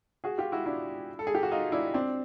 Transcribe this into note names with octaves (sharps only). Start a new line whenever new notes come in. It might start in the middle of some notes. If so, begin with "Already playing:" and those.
F#4 G#4
F4 G4
E4 F#4
D4 E4
A4
G#4
G4
F#4
D#4 F4
D4 E4
C4 D4